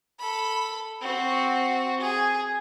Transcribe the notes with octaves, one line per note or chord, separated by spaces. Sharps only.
A4 B5
C4 F#4
G#4